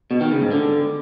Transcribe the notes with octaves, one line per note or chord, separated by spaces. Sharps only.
B2
D#3
C#3
G#2
D3